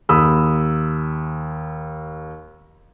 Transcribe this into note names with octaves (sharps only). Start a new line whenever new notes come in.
D#2 B5 D#6 E6